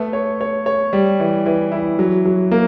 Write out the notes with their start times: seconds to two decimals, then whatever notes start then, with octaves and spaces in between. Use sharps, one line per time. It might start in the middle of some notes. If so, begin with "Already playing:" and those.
Already playing: A3 B3
0.13 C#5
0.41 C#5
0.66 C#5
0.93 G3
1.20 E3
1.46 E3
1.72 E4
1.99 F#3
2.25 F#3
2.51 A#3